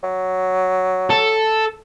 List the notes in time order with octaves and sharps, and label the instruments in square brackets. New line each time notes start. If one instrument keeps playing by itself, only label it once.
[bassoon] F#3
[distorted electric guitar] A4